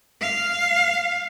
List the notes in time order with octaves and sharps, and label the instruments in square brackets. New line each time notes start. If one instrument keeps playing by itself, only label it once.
[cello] F5